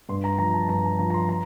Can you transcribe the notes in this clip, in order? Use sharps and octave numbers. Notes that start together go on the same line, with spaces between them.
G2 C6
A#5
F3 A#5
A5
G2 A#5
A5
F3 A#5
A#5
C6
A#5